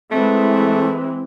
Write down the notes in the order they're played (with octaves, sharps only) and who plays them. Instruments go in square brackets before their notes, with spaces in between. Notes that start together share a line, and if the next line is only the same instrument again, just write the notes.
[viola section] E3 G#3 [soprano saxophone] A3 [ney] C4